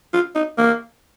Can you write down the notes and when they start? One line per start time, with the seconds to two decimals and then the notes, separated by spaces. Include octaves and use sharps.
0.13 F4
0.35 D#4
0.58 A#3